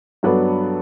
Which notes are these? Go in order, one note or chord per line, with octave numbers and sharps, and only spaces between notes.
G2 F#3 B3 D4 A4